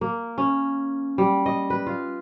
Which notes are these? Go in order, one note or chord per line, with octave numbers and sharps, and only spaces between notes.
A#3
C#4
G3
D#5
B4
F4